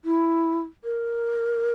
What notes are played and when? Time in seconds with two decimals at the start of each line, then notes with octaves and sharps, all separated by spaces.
0.05 E4
0.84 A#4